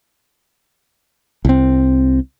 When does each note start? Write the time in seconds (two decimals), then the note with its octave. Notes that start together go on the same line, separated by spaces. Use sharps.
1.45 C2 C4